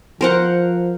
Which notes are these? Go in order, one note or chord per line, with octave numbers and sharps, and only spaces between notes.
F3 A#4 C5 F#5